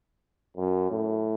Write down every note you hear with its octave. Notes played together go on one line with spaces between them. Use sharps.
F#2
A2